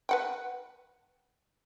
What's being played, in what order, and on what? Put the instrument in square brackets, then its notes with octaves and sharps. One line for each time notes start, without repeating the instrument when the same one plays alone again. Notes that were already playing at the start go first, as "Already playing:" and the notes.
[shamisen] B4 F#5 G5